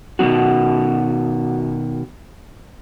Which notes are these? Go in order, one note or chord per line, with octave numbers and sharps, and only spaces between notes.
B2 D#3 G#3 C4 F#4